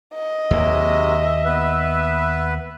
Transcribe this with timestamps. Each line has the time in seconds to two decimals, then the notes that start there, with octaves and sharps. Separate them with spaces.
0.14 D#5
0.51 D#2 C3 F#3 G#3 A#3 E5
1.45 B3 B4